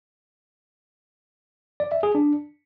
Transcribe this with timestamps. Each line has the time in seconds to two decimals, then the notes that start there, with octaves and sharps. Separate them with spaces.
1.80 D5
1.92 E5
2.03 G#4
2.15 D4